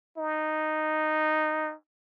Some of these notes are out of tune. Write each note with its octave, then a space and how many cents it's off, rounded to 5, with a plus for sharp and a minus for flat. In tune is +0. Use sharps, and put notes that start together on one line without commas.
D#4 -10